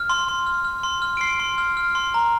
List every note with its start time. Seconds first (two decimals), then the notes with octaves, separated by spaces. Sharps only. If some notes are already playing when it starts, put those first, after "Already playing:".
Already playing: F6
0.10 C6
0.28 C6
0.47 F6
0.65 F6
0.83 C6
1.02 F6
1.17 D7
1.21 C6 C7
1.40 C6
1.58 F6
1.77 F6
1.95 C6
2.14 A#5